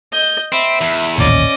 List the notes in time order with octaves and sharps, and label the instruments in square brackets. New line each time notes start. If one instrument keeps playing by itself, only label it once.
[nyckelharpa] D#5 [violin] G6
[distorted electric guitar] C4 [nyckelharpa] E5 [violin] B5
[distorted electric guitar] E2
[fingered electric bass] A1 D#2 A#2 [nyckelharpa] C#4 [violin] D5 D#5